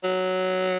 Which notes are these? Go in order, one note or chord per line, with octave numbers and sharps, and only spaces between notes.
F#3